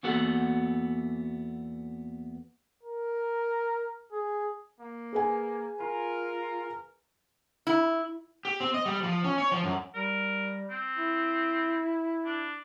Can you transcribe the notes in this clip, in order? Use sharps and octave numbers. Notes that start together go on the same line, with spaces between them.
E2 A#3 B3 F#4 A4 F#5
A#4
G#4
A#3
G#4 B4 G#5
F4 A#4
E4
G4
C4
D#5
G3
F3
C#4
C#5
F3
F#2
G3 A#4
C4
E4
D4